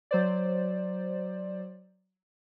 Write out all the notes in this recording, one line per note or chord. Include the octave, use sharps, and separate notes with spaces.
F#3 C5 D5